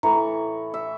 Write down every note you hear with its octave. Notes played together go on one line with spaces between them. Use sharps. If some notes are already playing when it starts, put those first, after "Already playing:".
A2 E3 C#5 A#5
E5